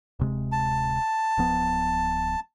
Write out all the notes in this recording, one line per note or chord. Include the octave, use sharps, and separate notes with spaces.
D1 C3 G#3
A5
D1 F3 B3